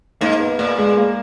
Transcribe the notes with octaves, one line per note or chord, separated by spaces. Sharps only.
G#2 A#3
B3
A#2 A#3
G#3
A#3